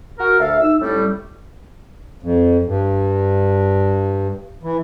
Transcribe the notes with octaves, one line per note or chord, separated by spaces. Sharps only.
F#4 A#4
D2 A4 E5 F5
D#4 E6
A2 G3 A3 C#4
F2
G2
E3